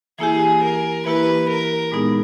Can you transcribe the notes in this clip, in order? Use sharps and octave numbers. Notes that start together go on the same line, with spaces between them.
E3 A#3 E4 G4 G#4
A#4
E3 A#3 E4 G4 B4
A#4
A#2 G#3 B3 D#4 G#4